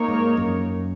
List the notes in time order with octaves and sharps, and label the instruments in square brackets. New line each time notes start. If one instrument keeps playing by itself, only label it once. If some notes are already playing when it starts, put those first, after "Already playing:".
Already playing: [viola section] A#3 D#4 A#4 C#5
[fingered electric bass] G#2
F#2